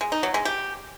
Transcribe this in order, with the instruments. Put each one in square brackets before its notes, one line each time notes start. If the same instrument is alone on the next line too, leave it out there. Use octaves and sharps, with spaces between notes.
[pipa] G#3
D#4
F#3
G#3
G4